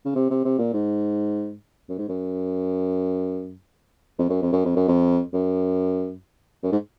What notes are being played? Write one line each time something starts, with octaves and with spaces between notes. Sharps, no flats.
C#3
C3
C3
C3
A#2
G#2
F#2
G#2
F#2
F2
F#2
F2
F#2
F2
F#2
F2
F#2
F#2
G#2